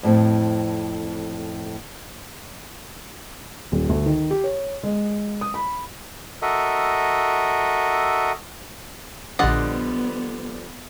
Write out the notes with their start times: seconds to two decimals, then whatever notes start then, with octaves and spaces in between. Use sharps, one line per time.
0.03 F2 A2 C4
3.72 D#1
3.89 D2
4.06 D#3
4.30 G4
4.44 C#5
4.83 G#3
5.41 D#6
5.54 B5
6.42 F#4 A4 A#4 D#5 E5
9.39 A#1 D3 F3 G3 B3 D#5 F#5 A6